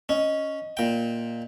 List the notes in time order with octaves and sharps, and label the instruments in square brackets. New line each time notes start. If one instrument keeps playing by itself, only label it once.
[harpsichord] C#4 [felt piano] D#5
[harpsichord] A#2 G5